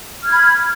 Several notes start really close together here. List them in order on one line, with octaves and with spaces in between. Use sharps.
F6 G#6 B5